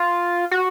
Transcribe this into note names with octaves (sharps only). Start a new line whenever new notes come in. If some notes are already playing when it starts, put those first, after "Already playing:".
Already playing: F4
F#4